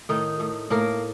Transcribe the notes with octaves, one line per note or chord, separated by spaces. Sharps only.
A2 D#3 D#4
A2
A2 A#3 A#4